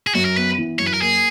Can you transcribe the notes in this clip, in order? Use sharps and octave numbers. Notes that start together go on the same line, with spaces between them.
G#4
F#2 F#4
A#4
B3 B4
E3
F#2 C#5
B4
A#4
A#3 G#4